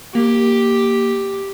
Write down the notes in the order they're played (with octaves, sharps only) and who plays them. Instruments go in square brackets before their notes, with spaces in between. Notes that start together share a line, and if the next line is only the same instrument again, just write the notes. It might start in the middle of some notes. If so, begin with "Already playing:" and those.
[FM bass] A#3 [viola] G4